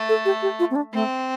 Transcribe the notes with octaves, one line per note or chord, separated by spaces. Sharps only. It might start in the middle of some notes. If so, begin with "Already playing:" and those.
Already playing: A3
A4
G4
G4
F4
C4
D4
A3 C4